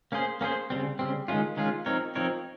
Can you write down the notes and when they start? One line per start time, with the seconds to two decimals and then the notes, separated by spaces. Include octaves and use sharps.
0.12 A#3 C#4 G#4 C5
0.41 A#3 C#4 G#4 C5
0.70 C#3 G3 C4
0.99 C#3 G3 C4
1.28 D#3 G#3 C#4 F4
1.57 D#3 G#3 C#4 F4
1.86 F3 C4 D#4 A#4 C#5
2.15 F3 C4 D#4 A#4 C#5